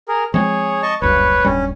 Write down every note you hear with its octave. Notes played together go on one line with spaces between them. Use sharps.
G#4 A#4
F3 G#3 C4 G#4 C#5
D#5 A5 C#6
F#1 D2 G2 B4 C#5
D1 G2 G3 C#4